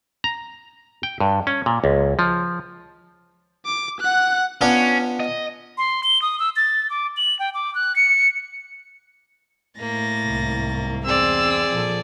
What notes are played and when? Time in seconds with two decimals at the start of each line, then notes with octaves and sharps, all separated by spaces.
0.24 A#5
1.03 G5
1.20 G2
1.47 C#4
1.66 A#2
1.84 C#2
2.19 F3
3.66 D6
4.00 F#5 F#6
4.61 B3 C#4 D4 F4
5.20 D#5
5.77 C6
6.03 G7
6.22 D#6
6.39 E6
6.56 A6
6.90 D6
7.17 F#7
7.39 G5
7.54 D6
7.75 F#6
7.96 C#7
9.79 A2 A#3 A6 A#6
10.26 C2 G#2
11.04 E2 C4 G#4 D5 E6
11.70 A#2 F3 A4